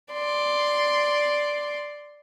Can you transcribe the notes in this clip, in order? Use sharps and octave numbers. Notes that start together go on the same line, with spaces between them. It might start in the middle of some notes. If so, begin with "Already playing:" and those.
D5 C6